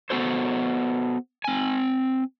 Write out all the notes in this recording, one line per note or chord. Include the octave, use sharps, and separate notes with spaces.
B3 F#4 A4 C5
C4 G#5